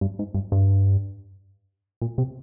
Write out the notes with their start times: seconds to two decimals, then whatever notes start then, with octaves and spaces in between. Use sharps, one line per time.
0.01 G2
0.19 G#2
0.34 G2
0.52 G2
2.01 A#2
2.18 C3